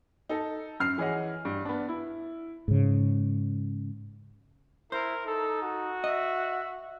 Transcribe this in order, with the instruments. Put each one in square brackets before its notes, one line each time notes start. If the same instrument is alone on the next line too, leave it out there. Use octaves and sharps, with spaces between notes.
[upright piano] D#4 A4
F#2 F6 C7
E3 G#4 C#5 D#5 F#5
G2
B3 D4
E4
[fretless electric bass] G#2 C#3
[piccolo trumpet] E4 [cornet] A#4 [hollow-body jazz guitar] C5
[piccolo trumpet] D#4 [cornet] A4
[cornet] F#4
[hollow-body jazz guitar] D#5 [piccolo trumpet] E5